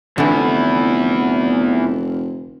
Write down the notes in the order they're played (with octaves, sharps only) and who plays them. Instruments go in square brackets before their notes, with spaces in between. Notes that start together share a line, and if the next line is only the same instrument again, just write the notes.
[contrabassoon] F1 [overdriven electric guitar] E2 E4 [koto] D3 E3